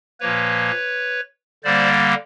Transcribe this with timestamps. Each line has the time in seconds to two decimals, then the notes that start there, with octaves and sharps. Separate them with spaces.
0.20 A#2 F3 A#3 B4 C#5
1.64 D3 G3 A#3 C5 D5